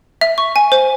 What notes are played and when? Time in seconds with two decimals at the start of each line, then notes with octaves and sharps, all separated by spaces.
0.21 E5
0.38 C#6
0.56 G#5
0.72 C5